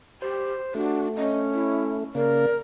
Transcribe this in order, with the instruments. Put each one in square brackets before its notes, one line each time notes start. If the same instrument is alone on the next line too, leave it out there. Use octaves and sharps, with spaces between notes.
[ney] G4 [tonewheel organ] C5
[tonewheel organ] A3 [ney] D4 [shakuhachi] F#4
[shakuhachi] C#4 [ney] D#5
[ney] E4
[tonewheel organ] C#3 A#3 [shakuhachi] A#4 [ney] D5